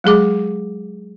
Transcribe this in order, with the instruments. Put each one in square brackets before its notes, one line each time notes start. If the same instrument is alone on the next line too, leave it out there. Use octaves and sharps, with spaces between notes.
[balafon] F#3 G#3 G#4 D6